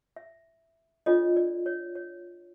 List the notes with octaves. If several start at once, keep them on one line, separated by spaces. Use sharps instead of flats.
E5
D4 F4 A4 C#5 D#5
D5
C#5
C#5